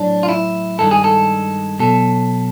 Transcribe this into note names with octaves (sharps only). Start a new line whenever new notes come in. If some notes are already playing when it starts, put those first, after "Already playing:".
Already playing: A2 F#3 D4
F4
E4
G2 D#3 G#3 A4
G#4
A4
B2 F#3 A4